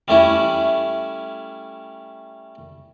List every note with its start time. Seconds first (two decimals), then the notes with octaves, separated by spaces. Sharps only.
0.08 G3 A3 C#4 E4